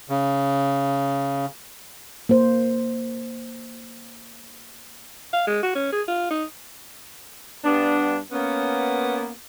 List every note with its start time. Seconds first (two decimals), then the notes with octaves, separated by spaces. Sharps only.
0.09 C#3
2.29 A#3 C5
5.33 F5
5.47 G#3
5.63 F#4
5.75 C#4
5.92 G#4
6.08 F4
6.30 D#4
7.64 G2 B3 D4
8.32 A#3 B3 C#4